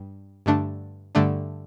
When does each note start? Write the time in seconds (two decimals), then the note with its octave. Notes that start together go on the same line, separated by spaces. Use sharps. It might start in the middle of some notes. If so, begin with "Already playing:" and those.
Already playing: G2
0.46 G2 D3 A3 D4
1.15 G2 D3 A3 D4